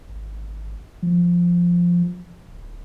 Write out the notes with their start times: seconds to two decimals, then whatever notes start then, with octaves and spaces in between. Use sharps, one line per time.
0.09 G#1
1.02 F3
2.48 D1